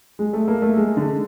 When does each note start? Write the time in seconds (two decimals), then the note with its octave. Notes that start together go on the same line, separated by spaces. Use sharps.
0.19 G#3
0.33 A3
0.48 A#3
0.62 A3
0.77 G#3
0.97 D3